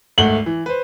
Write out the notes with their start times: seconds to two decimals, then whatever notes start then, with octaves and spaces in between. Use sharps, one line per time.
0.18 G#1 D2 A3 F#5 F#7 G7
0.46 E3
0.66 B4 C5